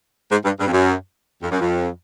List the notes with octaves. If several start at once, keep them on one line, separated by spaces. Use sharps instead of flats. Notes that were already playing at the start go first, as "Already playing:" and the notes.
G#2
G2
G2
F2
F#2
F2
F#2
F2